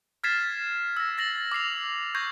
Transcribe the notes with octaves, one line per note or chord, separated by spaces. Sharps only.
F6 G#6 A6 B6 C7 E7
E6 A#6
A6 A#6 F#7
D6 E6 C7 F7
C#6 G6 G#6 A#6 C7